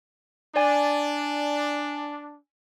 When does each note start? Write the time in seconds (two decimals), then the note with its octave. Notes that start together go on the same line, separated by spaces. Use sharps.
0.56 D4 D5 G#5